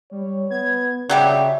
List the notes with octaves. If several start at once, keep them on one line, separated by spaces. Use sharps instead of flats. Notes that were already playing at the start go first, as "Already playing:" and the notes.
G3 C#5
B3 G#6
C#3 F#3 G3 G4 E5